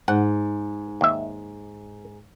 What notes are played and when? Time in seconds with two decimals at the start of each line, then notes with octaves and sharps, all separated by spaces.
0.08 G#2 F#5
1.01 D#2 E5